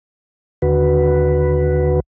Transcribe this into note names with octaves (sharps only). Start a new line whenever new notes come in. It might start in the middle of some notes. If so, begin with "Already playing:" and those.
D#2 D3 F#4 B4